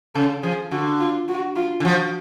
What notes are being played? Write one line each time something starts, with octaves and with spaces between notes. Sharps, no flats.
C#3 A4
F3 G#4
D3 F#4
F4
F#4
F4
D3
F3 F#4